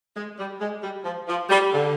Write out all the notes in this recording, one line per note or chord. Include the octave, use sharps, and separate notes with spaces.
G#3
G3
G#3
G3
F3
F3
G3
D3